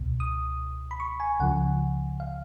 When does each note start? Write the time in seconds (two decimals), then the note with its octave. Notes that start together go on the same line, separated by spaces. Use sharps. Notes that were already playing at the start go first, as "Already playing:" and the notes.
Already playing: C#2 B2
0.20 D#6
0.91 B5
1.00 C#6
1.20 G#5
1.40 C#2 C#3 F3 F#5
2.20 F5